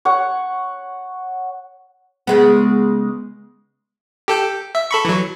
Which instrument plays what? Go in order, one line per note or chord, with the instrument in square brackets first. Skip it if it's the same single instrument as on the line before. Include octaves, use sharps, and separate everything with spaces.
[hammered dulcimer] C#5 F#5
[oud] C#3 G#3 B3
[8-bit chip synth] G4 A4 G5
E5
A4 B5 C#6
E3 F#3